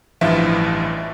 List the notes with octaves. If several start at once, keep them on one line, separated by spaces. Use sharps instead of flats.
A1 G2 E3 F3 F4 E5